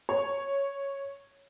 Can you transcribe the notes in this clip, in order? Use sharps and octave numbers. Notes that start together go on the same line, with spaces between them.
C#5